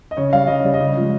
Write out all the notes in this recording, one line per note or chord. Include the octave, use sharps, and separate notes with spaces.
D#5
C#3 C#5
G3 F5
C#3 D#5
G3 C#5
D#5
C#3
F3 G#3